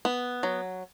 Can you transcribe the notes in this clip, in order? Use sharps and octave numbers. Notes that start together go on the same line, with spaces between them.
B3
F#3